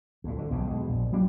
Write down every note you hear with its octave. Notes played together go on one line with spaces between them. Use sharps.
D2 A2
D3
B1 E2 G2 C#3
B2 G#3
A#1
F#3 G3 A#3 D4